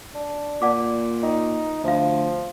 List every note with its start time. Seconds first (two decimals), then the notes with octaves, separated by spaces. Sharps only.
0.15 D4
0.62 A#2 D5 F#5 D6
1.23 D#4
1.84 D2 F3 E5 F5